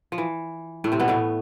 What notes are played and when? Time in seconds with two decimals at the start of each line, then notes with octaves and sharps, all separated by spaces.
0.12 F3
0.18 E3
0.84 A2 A3
0.92 C3 C4
1.00 B2 B3
1.08 A2 A3